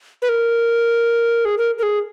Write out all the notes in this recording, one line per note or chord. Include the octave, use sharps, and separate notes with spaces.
B4
A#4
G#4
A#4
A#4
G#4